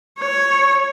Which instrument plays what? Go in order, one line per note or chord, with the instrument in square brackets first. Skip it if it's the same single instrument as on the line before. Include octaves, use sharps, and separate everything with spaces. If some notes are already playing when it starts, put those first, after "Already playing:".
[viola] C#5